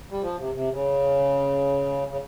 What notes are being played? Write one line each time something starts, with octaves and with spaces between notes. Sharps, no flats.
G3
F3
C3
C3
C#3
C#3